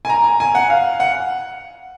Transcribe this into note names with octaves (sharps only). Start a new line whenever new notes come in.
G#5
A#5
A#5
G#5
F#5
F5
F#5